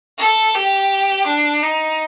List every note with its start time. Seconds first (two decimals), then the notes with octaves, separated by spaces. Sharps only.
0.19 A4
0.55 G4
1.26 D4
1.63 D#4